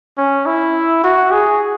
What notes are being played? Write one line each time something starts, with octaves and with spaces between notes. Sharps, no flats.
C#4
E4
F#4
G#4